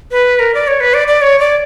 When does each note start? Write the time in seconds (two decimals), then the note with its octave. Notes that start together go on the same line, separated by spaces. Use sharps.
0.11 B4
0.39 A#4
0.54 D5
0.67 C#5
0.80 B4
0.94 D5
1.08 D5
1.22 C#5
1.40 D5